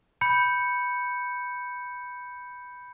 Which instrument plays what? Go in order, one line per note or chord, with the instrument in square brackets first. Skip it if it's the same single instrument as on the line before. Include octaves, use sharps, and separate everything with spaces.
[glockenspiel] B5 G6 C#7